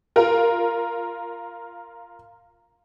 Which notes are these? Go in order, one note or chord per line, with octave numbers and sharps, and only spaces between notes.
F4 A#4